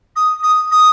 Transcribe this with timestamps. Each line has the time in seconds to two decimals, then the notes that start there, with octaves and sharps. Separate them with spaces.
0.16 D#6
0.43 D#6
0.72 D#6